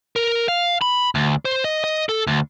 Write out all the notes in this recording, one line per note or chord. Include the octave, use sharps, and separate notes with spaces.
A#4
F5
B5
D2
C5
D#5
D#5
A4
D2